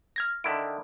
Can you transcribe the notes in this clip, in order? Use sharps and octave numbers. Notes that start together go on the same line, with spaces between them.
F6 G#6 A#6
D3 D#3 E4 D7